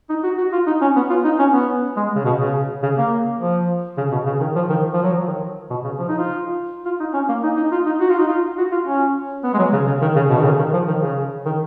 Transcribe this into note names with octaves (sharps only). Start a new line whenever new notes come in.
D#4
F#4
F#4
F4
D#4
C#4
B3
F4
D#4
C#4
B3
G#3
C#3
B2
C#3
C#3
A#3
F3
C#3
B2
C#3
D#3
F3
D#3
F3
F#3
F3
D#3
B2
C#3
F3
D#4
F4
F4
D#4
C#4
A#3
D#4
D#4
F4
D#4
F#4
F4
D#4
F4
F#4
F4
C#4
B3
G#3
F#3
C#3
C#3
D#3
C#3
B2
D#3
C#3
D#3
F3
D#3
C#3
D#3